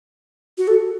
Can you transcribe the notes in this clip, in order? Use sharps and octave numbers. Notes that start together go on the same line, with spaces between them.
F#4
A4